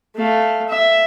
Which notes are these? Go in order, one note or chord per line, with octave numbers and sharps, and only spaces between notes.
A3 F5
E5